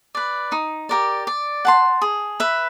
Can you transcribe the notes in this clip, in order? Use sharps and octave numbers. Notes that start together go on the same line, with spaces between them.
B4 D5
D#4
G4 A#4 D5
D5
F#5 A5 C6
G#4
B4 E5